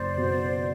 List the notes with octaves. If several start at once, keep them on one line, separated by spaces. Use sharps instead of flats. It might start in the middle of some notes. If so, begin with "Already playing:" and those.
Already playing: F#1 C5 D5
B2